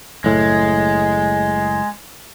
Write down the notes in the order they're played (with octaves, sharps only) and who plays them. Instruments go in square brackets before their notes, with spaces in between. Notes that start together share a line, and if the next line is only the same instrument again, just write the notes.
[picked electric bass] F#1 A2 [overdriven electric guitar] G#3